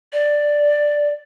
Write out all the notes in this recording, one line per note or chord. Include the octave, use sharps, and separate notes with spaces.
D5